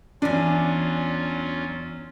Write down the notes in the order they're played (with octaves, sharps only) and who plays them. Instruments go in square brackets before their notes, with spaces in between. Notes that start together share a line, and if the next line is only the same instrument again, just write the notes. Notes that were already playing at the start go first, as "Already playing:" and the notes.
[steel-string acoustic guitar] E2 G#5 [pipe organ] F#3 C#4 F4 [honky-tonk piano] D4